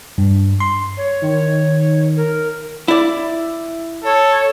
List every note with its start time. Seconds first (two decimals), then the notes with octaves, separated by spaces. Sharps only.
0.18 G2
0.60 C6
0.97 C#5
1.22 D#3
2.17 A#4
2.88 E4 D5
4.04 A4 C#5